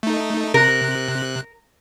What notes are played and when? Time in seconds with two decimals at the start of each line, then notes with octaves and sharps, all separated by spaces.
0.03 A3 D#4
0.54 C3 A#4 F#6